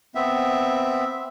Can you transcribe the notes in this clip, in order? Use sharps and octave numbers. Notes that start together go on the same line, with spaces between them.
B3 C4 E5